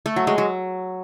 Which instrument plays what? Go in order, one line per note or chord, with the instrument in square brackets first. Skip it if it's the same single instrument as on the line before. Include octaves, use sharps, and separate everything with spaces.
[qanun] A3
F#3
G#3
F#3